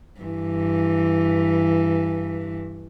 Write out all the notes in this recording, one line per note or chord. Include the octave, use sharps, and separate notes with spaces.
G2 E3